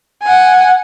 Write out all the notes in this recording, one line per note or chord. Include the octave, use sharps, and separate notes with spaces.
F#5 G#5